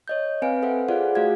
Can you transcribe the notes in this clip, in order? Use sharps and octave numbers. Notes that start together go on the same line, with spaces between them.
C#5 D#5 G6
C4 B4 F5 G#5 D7
A4 C5 E5 F#5
F4 G#4 C5 D5 F5 F#5
A3 F#4 G#4 F5 G#6